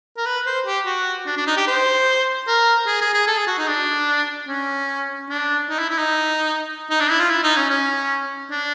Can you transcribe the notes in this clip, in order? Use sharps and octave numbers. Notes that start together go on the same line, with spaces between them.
A#4
B4
C5
G4
F#4
D4
D4
D#4
G4
C5
A#4
G#4
G#4
G#4
A4
G#4
F#4
D#4
D4
C#4
D4
D#4
E4
E4
D#4
D#4
D4
E4
F4
E4
D#4
C#4
C#4
D4